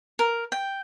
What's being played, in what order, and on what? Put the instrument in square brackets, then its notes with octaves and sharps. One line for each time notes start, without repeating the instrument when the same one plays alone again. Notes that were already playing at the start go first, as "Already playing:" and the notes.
[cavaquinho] A#4
G5